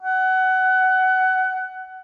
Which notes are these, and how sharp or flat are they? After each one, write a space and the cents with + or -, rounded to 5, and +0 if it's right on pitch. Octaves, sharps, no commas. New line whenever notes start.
F#5 +20